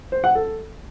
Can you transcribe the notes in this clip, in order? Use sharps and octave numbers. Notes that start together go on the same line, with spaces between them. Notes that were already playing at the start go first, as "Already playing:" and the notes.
C5
F#5
A4